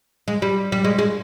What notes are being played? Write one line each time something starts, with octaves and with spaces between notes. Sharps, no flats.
G#3
G3
G3
G#3
G#3